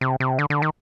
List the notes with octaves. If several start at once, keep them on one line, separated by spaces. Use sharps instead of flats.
C3
C3
D3
D3
D#3